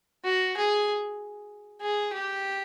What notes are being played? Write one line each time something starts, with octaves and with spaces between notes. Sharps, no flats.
F#4
G#4
G#4
G4